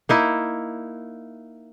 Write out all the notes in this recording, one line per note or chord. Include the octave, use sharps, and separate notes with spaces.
A#3 D#4 E4